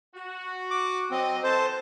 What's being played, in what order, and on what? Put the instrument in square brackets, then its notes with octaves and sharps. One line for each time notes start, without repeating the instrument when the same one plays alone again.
[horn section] F#4
[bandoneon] D6
[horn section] F#3 D#5 [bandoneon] C4
[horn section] E3 A4 A5 [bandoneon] C5